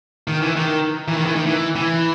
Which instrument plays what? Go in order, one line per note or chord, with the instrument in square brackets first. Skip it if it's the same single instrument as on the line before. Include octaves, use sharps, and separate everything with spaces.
[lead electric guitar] D#3
E3
D#3
E3
D#3
E3
D#3
E3
E3